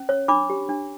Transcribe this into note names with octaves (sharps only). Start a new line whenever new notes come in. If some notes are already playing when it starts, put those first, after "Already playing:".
Already playing: C#4
C#5
D4 B5 D6
G4
D4